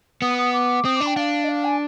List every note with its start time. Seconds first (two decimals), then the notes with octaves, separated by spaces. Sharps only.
0.21 B3 D#6
0.37 D#6
0.53 D6
0.84 C4 D#6
0.95 D6
1.01 D4
1.06 G5
1.16 D4 F5
1.43 D#5
1.48 F5
1.64 G#5